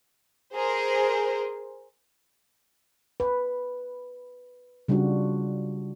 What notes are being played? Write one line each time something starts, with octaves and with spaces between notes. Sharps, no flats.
G#4 A#4 C5
B4
C#3 G3 D4 F4 F#4